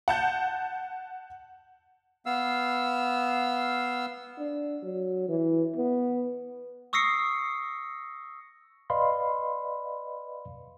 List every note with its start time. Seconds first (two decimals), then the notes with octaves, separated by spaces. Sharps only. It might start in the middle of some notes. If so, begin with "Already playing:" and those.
0.08 F#5 A5 G6
2.26 B3 F5 E6
4.38 D4
4.83 F#3
5.29 E3
5.76 B3
6.93 C#6 D#6 E6 A#6 C7 C#7
8.90 B4 D5 D#5 F5 B5 C6